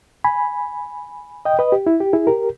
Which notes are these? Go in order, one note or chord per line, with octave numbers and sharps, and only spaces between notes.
G#5 B5
D#5 G5
B4 D#5
G4
E4
G4
E4 G#4
G4 A#4